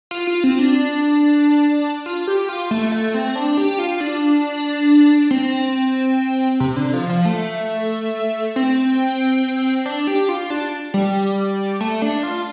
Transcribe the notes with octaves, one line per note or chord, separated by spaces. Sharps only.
F4
F4
C4
D4
F4
G4
F4
A3
A3
C4
D4
G4
F4
D4
C4
C3
D3
F3
F3
A3
C4
D4
G4
F4
D4
G3
A3
D4
F4